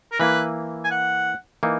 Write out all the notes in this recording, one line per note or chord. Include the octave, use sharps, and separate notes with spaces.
A#4
E3 A#3 E4 B4
G#5
F#5
E3 A#3 D#4